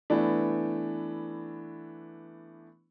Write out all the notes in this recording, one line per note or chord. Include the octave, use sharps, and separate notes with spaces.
E3 A3 B3 D4